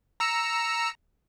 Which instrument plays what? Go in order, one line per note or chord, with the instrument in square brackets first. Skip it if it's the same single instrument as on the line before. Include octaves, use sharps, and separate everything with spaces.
[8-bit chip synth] A#5 E6 C#7